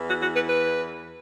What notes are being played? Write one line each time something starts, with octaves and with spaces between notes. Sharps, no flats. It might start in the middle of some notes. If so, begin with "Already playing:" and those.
Already playing: E2 E3
F#4
F#4
B4
B4